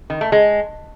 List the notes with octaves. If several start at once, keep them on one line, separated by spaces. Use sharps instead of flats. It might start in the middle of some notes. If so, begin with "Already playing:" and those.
D#3
A3
G#3